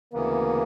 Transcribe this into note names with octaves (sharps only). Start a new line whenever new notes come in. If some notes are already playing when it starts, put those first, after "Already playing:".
D2 C#3 E3 A#3 B3